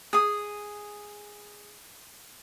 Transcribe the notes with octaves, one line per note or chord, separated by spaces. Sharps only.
G#4 D#6